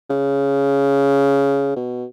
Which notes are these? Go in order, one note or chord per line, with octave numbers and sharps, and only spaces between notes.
C#3
B2